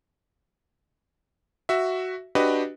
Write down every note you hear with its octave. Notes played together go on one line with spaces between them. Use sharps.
F#4 E5
D4 F#4 G4 B4 D#5